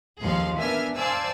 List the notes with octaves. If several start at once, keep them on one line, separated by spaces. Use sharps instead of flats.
A1 D#2 F3 G#4 F5 C6
B3 D4 A#4 E5 G#5 F6
C5 D5 F5 G#5 A5 E6